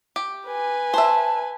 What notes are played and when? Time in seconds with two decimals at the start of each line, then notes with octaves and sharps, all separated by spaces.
0.16 G4
0.47 B4 G#5
0.94 C5 E5 A5